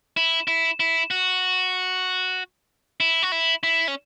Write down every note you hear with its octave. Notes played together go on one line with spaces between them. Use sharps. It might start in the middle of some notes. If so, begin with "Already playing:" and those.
E4
E4
E4
F#4
E4
F#4
E4
E4
C#4